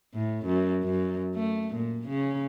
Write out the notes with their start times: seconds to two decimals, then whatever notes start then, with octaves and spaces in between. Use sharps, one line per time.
0.14 A2
0.46 F#2
0.84 F#2
1.35 A3
1.75 A#2
2.09 C#3